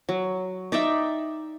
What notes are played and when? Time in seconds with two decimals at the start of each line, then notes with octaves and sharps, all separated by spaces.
0.09 F#3
0.72 D#4 D5 E5 G5